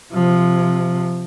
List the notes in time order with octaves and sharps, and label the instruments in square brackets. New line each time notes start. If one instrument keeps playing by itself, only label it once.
[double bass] C3 F3